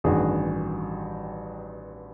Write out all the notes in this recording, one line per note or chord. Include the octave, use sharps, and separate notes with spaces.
A1 G2 D#3 F#4 G#4